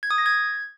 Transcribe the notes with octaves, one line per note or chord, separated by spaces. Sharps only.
G#6
D#6
A#6
G#6